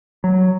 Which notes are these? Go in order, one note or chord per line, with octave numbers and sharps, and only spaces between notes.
F#3